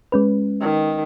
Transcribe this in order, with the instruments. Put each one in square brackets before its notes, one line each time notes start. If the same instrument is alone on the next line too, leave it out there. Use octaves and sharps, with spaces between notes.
[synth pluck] G#3 C#4 B4
[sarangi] D#3